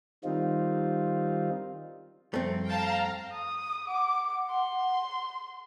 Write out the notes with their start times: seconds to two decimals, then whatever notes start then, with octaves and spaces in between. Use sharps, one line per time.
0.24 D#3 G3 C4 D#4 F4
2.34 F#2 F3 G3 A3 C4
2.64 F5 G5 A5 A#5
3.32 D#6
3.88 F#5 D6
4.50 C6